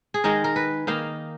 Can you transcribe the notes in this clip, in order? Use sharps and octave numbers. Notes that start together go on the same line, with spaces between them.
G#4
D#3 G#3 D#4 A#4
A#4
B4
D#3 A#3 D#4 F5